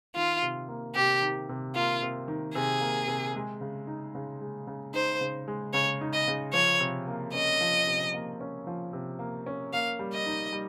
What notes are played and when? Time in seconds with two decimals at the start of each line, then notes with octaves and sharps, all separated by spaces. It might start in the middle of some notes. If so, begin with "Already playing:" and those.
0.16 D#3 F4
0.42 C3
0.69 A#3
0.95 C3 G4
1.22 D#3
1.49 C3
1.75 A#3 F4
2.02 C3
2.28 D#3
2.55 C3 G#4
2.81 A#3
3.08 C3
3.35 G#3
3.61 C#3
3.87 D#4
4.15 C#3
4.41 G#3
4.67 C#3
4.94 D#4 C5
5.21 C#3
5.48 G#3
5.73 C#3 C#5
6.01 D#4
6.13 D#5
6.28 C#3
6.53 F3 C#5
6.80 C3
7.07 A#3
7.33 C#4 D#5
7.61 F3
7.87 C3
8.14 A#3
8.40 C#4
8.67 F3
8.93 C3
9.19 A#3
9.46 C#4
9.73 A#3 F5
9.99 G3
10.13 D#5
10.26 D#4
10.53 G3